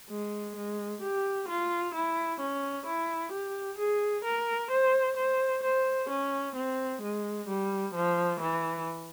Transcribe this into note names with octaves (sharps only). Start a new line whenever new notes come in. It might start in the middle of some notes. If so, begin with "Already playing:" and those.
G#3
G#3
G4
F4
E4
C#4
E4
G4
G#4
A#4
C5
C5
C5
C#4
C4
G#3
G3
F3
E3